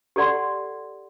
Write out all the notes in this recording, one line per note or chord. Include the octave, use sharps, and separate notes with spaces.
G4 A4 D5 F#5 C6